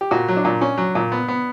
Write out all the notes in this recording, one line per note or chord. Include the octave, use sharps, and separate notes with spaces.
G4
A#2 F#4
F#3
D4
A#2
C#4
F#3
A#2
B3
B3